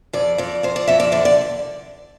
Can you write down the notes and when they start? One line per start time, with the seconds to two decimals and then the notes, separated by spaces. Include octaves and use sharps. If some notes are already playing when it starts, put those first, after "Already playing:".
0.13 F2 D5
0.38 F2 D5
0.63 F2 C5
0.76 D5
0.88 F2 E5
1.00 D5
1.12 D3 D5
1.25 D5